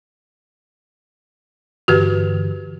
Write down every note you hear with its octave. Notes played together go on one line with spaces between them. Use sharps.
G2 D3 E3 F#4 G4 B4